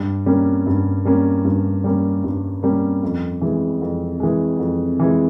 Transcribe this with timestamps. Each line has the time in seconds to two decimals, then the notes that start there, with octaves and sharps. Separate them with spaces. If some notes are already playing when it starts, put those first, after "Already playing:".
Already playing: G2
0.26 G3 A#3 C#4
0.67 G2
1.05 G3 A#3 C#4
1.45 G2
1.84 G3 A#3 C#4
2.24 G2
2.63 G3 A#3 C#4
3.03 F2
3.41 E3 G#3
3.81 F2
4.20 E3 G#3
4.59 F2
5.00 E3 G#3